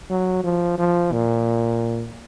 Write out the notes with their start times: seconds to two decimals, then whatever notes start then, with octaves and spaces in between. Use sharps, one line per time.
0.10 F#3
0.43 F3
0.78 F3
1.12 A#2